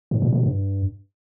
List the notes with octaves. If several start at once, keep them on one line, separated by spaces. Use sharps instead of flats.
G#2
A#2
B2
G2